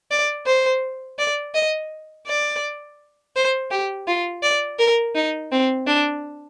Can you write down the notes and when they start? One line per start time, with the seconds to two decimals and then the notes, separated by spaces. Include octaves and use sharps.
0.11 D5
0.47 C5
1.19 D5
1.54 D#5
2.27 D5
3.36 C5
3.71 G4
4.08 F4
4.43 D5
4.79 A#4
5.15 D#4
5.52 C4
5.88 D4